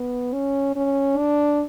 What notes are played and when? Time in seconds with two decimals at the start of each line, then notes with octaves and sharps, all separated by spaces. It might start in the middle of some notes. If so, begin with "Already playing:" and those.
Already playing: B3
0.33 C#4
0.76 C#4
1.19 D4